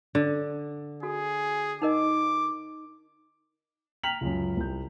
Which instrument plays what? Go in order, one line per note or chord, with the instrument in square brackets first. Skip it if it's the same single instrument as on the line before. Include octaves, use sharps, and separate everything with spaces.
[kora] D3
[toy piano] F#4 A4 [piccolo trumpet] G#4
[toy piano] D#4 A#4 D#5 [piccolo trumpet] D6
[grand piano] G5 A#5 F6 B6 F7 F#7
C#2 F#2
C2 G6